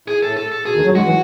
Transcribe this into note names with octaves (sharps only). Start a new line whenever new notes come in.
A2 G#4
A2 A4
A4
A4
B2 G#4
D#2 D#3
F#2 F#3
G#2 G#3 F#4
E3